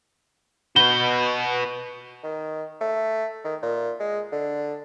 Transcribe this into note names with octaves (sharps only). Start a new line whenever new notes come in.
B2 F#4 B4 B5 G6 G7
D#3
A3
D#3
A#2
G#3
D3